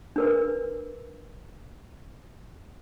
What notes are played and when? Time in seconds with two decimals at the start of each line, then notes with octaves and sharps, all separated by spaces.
0.16 D4 A#4 B4